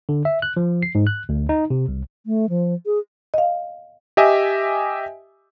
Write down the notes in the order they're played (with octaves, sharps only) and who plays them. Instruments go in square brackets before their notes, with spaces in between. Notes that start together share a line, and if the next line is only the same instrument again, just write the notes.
[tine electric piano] D3
E5
F#6
F3
C7
G#2
F#6
D2
D#4
C3
C2
[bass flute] A3
F3
G#4
[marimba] D#5 F5
[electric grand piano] G4 D#5 E5 G#5